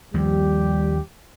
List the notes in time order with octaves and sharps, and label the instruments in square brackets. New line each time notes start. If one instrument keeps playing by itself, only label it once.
[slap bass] D#2 F3 [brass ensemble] G3 G4